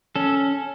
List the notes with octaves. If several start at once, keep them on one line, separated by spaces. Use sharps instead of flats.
C#4 A4